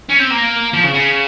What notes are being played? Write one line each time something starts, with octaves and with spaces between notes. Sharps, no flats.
C#4
C4
A#3
F3
C#3
C#3